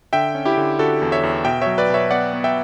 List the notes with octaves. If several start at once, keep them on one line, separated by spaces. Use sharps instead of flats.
D3 E5 G5
C#4
E4 G4
D3
D3 F#4 A4
E2
C#5 E5
E2
B2 E5 G5
F#3 C#5 E5
B4 D5
B2 C#5 E5
B3 D5 F#5
B3
E5 G5